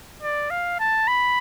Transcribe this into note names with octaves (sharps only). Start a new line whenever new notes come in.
D5
F5
A5
B5